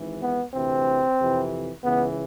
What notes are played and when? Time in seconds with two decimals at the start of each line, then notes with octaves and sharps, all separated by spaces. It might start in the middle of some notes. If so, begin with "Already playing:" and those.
Already playing: G#1 G#2 E3
0.22 B3
0.54 D2 C3 E3 C4
1.19 F2 C3 E3
1.83 C#2 C#3 E3 B3